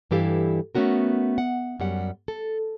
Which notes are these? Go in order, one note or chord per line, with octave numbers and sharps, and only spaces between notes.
G2 E3 E4 G4 A4 F5
A3 B3 C#4 F#4 A#4
F#5
F#2 G3 F#5
A4